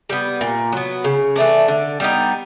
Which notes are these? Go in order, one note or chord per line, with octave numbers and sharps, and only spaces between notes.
G3 B3
A#2
F#3 B3
C#3
E3 A3 D4
D3
G3 B3 D#4